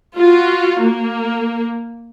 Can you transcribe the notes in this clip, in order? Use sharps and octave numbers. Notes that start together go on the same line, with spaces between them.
F4 F#4
A#3